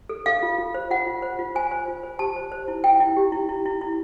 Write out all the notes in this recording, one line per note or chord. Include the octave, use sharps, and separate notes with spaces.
A4
A4 F5
F4
F4
C5
F4 F#5
F4
C5
F4
C5 G#5
C5
F4
C5
G4 A5
C5
C5
E4
E4 G5
E4
G4
E4
E4
E4
E4